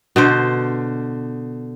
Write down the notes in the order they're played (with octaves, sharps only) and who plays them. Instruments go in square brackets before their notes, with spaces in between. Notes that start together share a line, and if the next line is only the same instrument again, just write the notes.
[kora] B2 D3 C5